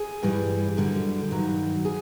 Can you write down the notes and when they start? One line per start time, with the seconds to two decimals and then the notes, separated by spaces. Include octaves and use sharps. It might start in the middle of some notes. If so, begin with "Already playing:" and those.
Already playing: G#4
0.23 G2 E3 G3
0.77 F#2 D3 G3
1.31 G2 D#3 F#3
1.85 G#4